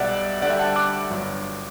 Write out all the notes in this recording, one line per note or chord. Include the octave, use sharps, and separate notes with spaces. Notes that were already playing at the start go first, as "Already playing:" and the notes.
Already playing: B1 B2 G3 D5 E5 F#5
D2 D3 G3 D5 F#5
E5 G5
F#5 A5
D6 F#6
G1 G2 F#3